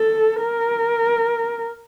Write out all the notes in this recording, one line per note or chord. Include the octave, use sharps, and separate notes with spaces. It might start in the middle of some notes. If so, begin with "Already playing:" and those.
Already playing: A4
A#4